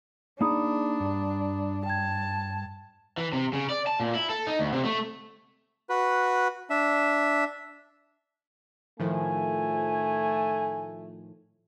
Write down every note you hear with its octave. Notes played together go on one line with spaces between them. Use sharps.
A#3 D4 D#4 G#4 A#5 B5 D#6
G2
G5 A5 G#6
E3
C3
C#3
D5
A5
A#2
E4
A4
D#4
D2
C3
A3
F#4 B4
D4 E5
A2 D#3 F3 A3 G#5